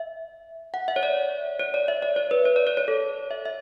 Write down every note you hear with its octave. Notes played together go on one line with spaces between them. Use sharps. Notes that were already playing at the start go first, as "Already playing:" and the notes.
Already playing: E5
F#5
E5
C#5
D5
C#5
D5
E5
D5
C#5
B4
C#5
D5
C#5
C#5
A4
E5
E5